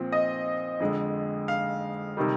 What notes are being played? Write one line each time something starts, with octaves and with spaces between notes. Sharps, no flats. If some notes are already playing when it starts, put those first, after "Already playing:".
Already playing: A#2 F3 C4
D#5
F2 D3 G#3
F5
C3 D#3 G3